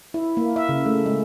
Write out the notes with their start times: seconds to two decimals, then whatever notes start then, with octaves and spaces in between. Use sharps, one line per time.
0.14 E4
0.37 A#3
0.56 E5
0.69 C#3
0.86 A3
1.06 G#3